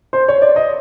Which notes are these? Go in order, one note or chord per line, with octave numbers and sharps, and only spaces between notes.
C5
C#5
D5
D#5